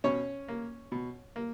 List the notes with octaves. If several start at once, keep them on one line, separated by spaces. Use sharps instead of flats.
B2 C#4 C#5
A#3
B2
A#3